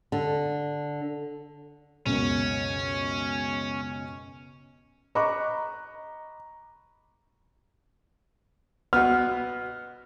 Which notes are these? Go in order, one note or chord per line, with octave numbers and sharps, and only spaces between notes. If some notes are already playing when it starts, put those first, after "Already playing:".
D3
C#2 F#2 B2 C#4
D#5 A#5 B5 C#6 D6 F#6
B2 B3 F6